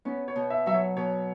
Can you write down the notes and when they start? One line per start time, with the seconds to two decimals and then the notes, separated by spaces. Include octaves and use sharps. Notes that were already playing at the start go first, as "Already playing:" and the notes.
0.05 B3 C#4
0.28 C#5
0.36 B2
0.50 E5
0.66 F#3 E5
0.74 C#5
0.97 B2 C#5